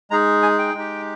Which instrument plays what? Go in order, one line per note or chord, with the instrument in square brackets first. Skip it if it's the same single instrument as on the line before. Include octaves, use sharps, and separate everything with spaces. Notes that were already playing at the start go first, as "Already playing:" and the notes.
[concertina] G#3 D#4 G#4 A#5
G#5
G5
G#3 D#4 G4